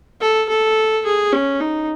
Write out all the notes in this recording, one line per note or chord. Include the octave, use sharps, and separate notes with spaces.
A4
A4
G#4
C#4
D#4